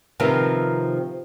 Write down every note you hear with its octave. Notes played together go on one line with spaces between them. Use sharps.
C3 D#3 F3 B3 C4 A#4